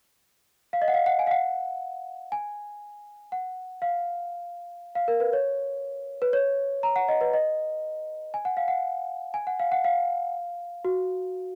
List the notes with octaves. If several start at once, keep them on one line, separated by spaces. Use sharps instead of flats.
F5
D#5
F#5
F5
F#5
G#5
F5
F#5
G#5
F#5
F5
F5
A#4
B4
C#5
B4
C#5
A#5
F#5
D#5
B4
D#5
G#5
F#5
F5
F#5
G#5
F#5
F5
F#5
F5
F#4